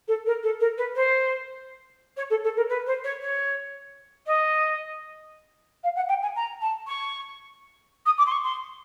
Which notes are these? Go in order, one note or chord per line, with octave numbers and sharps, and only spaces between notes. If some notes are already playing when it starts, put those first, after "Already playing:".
A4
A#4
A4
A#4
B4
C5
C#5
A4
A4
A#4
B4
C5
C#5
C#5
D#5
F5
F#5
G5
G#5
A#5
A5
C#6
D#6
D6
C6
C#6
C6